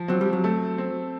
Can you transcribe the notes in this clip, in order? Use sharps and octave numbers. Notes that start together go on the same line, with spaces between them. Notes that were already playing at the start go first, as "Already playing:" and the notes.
Already playing: F3
F#3 C4
G3
F#3
A3
C4